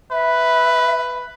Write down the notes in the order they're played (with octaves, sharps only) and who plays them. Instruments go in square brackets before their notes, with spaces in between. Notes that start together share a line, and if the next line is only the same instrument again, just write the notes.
[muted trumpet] B4 [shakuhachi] E5